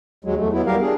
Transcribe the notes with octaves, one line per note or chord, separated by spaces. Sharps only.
D#2 F#3 G#3
E2 A3
F#3 B3 E4
G3 G4 A#4 F5
D4 G#4